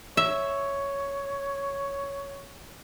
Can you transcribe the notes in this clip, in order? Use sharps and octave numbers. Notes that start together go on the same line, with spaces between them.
C#5 E5